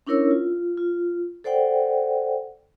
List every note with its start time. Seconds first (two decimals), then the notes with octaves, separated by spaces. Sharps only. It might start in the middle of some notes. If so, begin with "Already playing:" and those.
0.07 C#4 D4 E4 A#4 C#5 E6
0.31 F4
0.77 F4
1.44 A4 C5 D5 F#5 G5